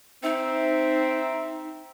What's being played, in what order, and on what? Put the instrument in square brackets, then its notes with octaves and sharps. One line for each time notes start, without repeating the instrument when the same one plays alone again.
[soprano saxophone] C4 [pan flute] D#4 [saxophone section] E5